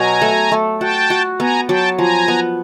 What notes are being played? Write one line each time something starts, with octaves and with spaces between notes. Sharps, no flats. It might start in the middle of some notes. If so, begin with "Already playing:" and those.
Already playing: B2 F#3 G#5 A#5
A3
A3
F#4 G5 A5
F#4
B3 G#5 A#5
F#3 G5 A5
F3 G#5 A#5
B3